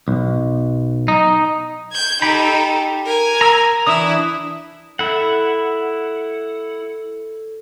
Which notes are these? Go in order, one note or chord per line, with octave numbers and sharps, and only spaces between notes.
B1
D#4
G6 G#6
D#4 G4 A4 G5 B5
A#4 G#5
A#5 E6
E3 D4 E4 D#6
E4 A4 F#5